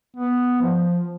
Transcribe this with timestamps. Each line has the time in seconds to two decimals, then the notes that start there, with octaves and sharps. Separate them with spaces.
0.17 B3
0.61 F3